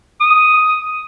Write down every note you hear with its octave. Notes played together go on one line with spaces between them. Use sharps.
D#6